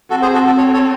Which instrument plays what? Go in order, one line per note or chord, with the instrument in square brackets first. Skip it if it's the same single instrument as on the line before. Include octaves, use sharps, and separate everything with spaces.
[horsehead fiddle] C4 [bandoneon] F#4 A4
[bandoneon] G#4 C5
F#4 A4
F#4 A4
A4 C#5
A4 C#5